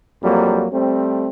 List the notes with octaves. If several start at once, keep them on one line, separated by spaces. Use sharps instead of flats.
F2 F#3 G3 A#3
G3 A3 C4